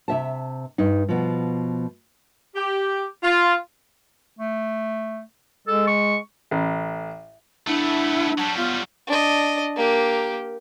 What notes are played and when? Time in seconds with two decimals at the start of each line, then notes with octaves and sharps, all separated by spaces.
0.08 C3 E5 A5
0.78 G2 D#4
1.09 B2 F3
2.56 G4
3.23 F4
4.38 A3
5.68 G#3 A4
5.87 C#6
6.51 A1
7.67 A3 B3 D4 E4
8.39 F#3 G3 A5
8.57 B3 F4
9.07 D4 D#5
9.76 A#3 G4